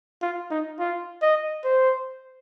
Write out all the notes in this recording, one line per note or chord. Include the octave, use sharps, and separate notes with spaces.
F4
D#4
F4
D#5
C5